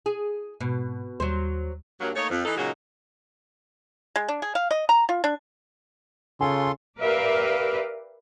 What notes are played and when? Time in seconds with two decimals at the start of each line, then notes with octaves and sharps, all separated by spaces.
0.06 G#4
0.61 G#2 B2
1.20 D#2 F#3 G3 C5
2.01 G2 F#3 A#3
2.15 A3 A#3 D#4 C#5
2.30 F2
2.45 E3 D#4 A4
2.57 A#2 C#3 F#3 G#3 D#4 F#4
4.16 G#3
4.28 D4
4.42 G#4
4.55 F5
4.71 D#5
4.89 A#5
5.09 F4
5.24 D4
6.41 C#3 F4 A4 G#5 C6
7.01 G4 A#4 B4 D5 E5 F5